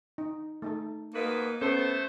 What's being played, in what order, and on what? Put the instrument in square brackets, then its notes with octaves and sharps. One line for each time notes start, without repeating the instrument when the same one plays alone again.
[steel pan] D#4
A3 D#4 A4
[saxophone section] G#2 B2 B4 [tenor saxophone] A#3
[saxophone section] A3 C5 [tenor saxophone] B3 [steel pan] C#4 A4